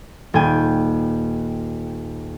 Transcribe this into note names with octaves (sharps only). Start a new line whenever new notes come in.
D#1 G5 G#5